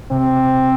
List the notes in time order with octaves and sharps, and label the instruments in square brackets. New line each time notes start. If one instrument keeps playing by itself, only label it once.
[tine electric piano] C3 [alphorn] C4